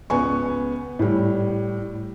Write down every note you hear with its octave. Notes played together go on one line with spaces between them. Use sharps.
C#2 B3 G#5 C#6
A2 G3